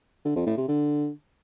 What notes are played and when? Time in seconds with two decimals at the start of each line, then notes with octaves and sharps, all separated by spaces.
0.25 D3
0.36 F2
0.47 A2
0.57 C3
0.68 D3